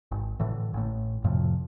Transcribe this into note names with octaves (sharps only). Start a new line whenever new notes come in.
G#1
A2 D3 E3
A1 A2
F2 A2 C3 F3